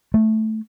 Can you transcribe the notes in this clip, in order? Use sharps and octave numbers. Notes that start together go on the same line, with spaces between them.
A3